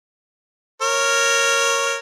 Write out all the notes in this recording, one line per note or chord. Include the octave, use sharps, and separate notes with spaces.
A#4 C#5